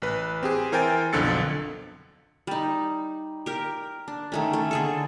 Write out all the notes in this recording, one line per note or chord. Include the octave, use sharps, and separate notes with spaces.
A1 B4
C4 G4 G#4
E3 A#4 C5 G5 G#5 A6
B1 F2 D3 E6 A6 C#7
G3 D#4
G4 A#4
D4
D#3 A3 C#4
A3
D3 G#4 A4